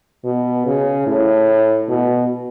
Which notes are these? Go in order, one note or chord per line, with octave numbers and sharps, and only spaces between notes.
B2
C#3
A2
B2